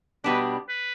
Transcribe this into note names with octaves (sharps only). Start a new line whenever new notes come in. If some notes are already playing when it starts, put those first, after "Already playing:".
B2 G3 B3 D4 B4
B4